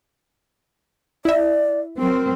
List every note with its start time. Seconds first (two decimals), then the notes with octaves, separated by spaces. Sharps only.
1.25 E4 D5 E5
1.99 F#3 C4 A#4